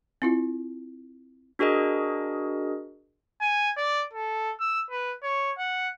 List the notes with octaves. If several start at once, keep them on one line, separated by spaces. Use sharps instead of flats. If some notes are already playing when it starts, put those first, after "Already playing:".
C4 E4 F4
D4 F#4 G#4 A#4 D#5
G#5
D5
A4
E6
B4
C#5
F#5